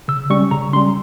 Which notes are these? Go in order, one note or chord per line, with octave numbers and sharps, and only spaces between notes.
C#3 E6
G3 C#4 C#6
C#3 A#5
G3 C#4 C6